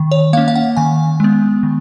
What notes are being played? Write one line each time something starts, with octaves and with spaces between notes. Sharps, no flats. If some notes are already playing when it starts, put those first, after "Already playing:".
Already playing: D#3
C#5
A#3 C#4 F5
F5
F#5
D#3 G#5
G#3 B3
D#3